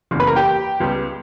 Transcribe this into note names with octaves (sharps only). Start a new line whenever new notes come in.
F#1 E2 C#3
B4 B5
A#4 A#5
G4 G5
C#2 C#3 G3 B3